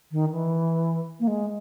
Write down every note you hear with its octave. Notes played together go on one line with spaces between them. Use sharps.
D#3
E3
A#3
G#3